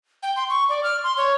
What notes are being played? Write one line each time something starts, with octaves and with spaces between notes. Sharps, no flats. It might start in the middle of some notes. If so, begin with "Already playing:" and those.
G5
C6
C#6
D5
F6
C6
C#5